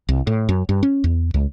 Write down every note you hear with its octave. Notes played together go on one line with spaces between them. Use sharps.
C2
A2
F#2
G2
C#4
E2
C#2